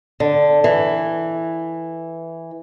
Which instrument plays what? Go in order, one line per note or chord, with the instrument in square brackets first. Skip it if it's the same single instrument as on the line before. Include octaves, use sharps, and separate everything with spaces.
[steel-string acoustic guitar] D3
E3